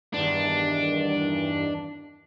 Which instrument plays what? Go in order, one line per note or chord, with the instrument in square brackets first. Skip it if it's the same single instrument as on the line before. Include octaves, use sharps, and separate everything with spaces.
[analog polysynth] E2 G2 D#3 [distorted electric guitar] D4